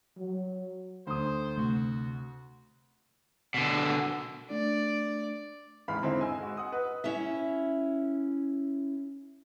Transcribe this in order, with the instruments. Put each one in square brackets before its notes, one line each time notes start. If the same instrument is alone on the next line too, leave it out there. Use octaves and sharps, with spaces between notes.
[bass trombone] F#3
[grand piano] D2 D#6 [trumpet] C5
[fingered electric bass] C3 A3 [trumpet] F#4
[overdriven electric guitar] B2 D3
[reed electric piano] A3 D4 [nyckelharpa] D5
[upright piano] E1 A1 E2 G#2 F5 B5
G#2 D3 C4 D#4 E4
D#5 G#5 E6
G#3 F#4
F#5 D#6
B4 D#5 D#6
[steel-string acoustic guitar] C#4 E4 E5